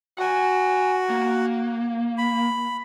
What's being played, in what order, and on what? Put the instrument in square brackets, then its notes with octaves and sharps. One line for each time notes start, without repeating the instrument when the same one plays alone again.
[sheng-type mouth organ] F#4 [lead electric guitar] F#5 G#5
[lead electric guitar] A#3
[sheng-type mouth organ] B5